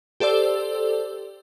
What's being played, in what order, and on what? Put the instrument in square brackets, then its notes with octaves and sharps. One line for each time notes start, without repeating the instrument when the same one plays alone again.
[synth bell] G4 A4 C5 D5 E6